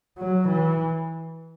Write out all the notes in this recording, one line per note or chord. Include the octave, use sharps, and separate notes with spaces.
F#3
E3